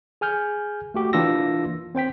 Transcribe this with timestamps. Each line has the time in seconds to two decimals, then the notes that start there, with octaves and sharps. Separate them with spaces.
0.21 G#4 G#5 F6 G6
0.94 A3 F#4 G4
1.13 E3 A#3 D4 F4 E6 A#6
1.95 C4 C5 G5 B6